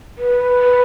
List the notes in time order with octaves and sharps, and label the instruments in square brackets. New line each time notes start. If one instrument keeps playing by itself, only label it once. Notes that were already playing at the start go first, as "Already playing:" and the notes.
[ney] B4